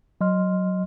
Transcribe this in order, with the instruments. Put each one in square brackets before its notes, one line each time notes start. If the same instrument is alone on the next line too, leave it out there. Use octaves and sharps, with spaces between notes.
[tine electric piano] F#3 D#5 C6 F6